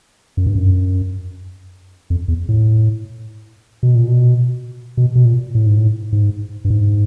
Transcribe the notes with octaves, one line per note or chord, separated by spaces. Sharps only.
F#2
G2
F#2
F2
E2
A2
B2
A#2
B2
B2
B2
A#2
A2
G#2
A2
G#2
G2
G#2